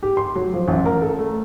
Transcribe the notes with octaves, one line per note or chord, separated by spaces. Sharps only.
G4
C6
F#3
F3
A1
A#4
A4
A3